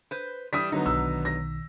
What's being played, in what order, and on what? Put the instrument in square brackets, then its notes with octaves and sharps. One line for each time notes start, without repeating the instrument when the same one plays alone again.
[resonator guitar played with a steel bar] B4 C5
[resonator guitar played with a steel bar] E3 G3 D4 [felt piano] D#6 B6
[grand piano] D3 F#3 B3 [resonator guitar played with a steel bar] D#4
[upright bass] B1 D#3 [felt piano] E6
[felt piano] A#6